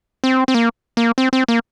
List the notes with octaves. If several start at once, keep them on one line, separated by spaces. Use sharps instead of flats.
C4
C4
A#3
A#3
C4
C4
A#3